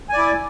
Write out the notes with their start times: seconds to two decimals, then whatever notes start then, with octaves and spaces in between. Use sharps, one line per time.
0.09 G#5
0.13 D5
0.17 E4